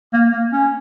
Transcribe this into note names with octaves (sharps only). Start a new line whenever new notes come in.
A#3
A#3
C#4